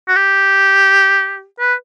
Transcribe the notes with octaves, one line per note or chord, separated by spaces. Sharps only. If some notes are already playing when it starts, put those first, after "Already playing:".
F#4
G4
B4